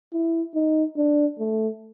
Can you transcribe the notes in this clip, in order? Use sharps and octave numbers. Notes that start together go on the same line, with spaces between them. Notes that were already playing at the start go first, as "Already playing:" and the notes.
E4
D#4
D4
A3